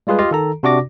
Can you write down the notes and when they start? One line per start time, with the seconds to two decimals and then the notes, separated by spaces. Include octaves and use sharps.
0.07 G3 G#3 F4 G#4 B4
0.19 F4 G4 D#5 F5
0.31 D#3 A4 A#5
0.63 C3 D4 F#4 D5 D6 A#6